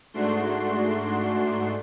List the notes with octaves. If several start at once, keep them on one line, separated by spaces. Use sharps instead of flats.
G#2 A3 D4 F#4 C6